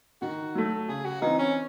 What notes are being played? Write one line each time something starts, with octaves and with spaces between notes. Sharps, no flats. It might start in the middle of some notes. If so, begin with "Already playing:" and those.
D#3 F#4
F#3 A3
C#3 G#4
F#4
E3 C4 D#4
C#4